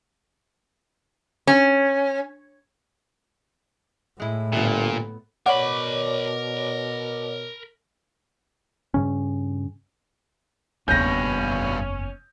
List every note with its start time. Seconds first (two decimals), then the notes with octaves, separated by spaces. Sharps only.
1.47 C#4
4.20 A2 G#3 E4
4.53 G1 A#2 A3 B3 A4
5.46 B2 A#4 C#5 D5 F#5 B5 D6
8.94 G2 C#3 C#4
10.88 F#1 E2 G2 B2 C#4 G6 A#6